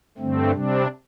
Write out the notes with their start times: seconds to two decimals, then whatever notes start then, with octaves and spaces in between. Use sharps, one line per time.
0.18 G2 D3 A3 C4
0.52 C3 G3 C4 D4